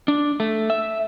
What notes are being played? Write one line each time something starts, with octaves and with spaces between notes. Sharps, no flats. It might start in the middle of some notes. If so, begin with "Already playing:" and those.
D4
A3
E5